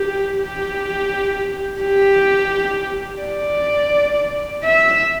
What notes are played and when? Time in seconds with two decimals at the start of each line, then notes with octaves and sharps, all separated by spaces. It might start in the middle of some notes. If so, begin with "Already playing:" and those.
Already playing: G4
0.37 G4
1.80 G4
3.22 D5
4.64 E5